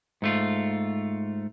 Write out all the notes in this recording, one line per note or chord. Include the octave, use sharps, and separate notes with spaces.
G#2 A3 F4